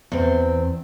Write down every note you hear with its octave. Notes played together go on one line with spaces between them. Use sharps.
E2 C4